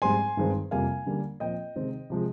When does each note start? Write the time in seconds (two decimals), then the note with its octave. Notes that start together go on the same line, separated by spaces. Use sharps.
0.02 G#2 G3 C4 G#5 C6
0.37 G2 D#3 G#3 C4
0.71 F2 C3 G3 A#3 F5 G#5
1.06 D3 G3 A#3
1.40 A#2 F3 C4 D#5 G5
1.76 C3 D#3 G#3 C4
2.10 C3 F3 G#3